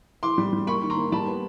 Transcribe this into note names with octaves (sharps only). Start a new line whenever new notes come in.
E3 C6 D6
G3
G3
A#3 B5 C#6
D#3
A#5 C6
A#3
G3 A5 B5
B3